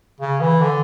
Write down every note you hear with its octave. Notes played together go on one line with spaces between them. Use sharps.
C#3
E3
D3